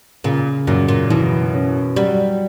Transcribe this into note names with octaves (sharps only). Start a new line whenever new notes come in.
A#2 C#3
F#2 A#2
A#2
B2 E3
C#4
F#3 G3